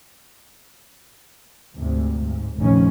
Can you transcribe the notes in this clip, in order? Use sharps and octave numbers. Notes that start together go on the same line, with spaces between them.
D2 G#2 C3
G#2
F1 A#1 D#3 C#4